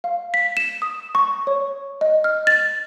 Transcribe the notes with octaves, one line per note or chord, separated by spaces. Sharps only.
F5
B6
E7
D#6
C#6
C#5
D#5
F6
A6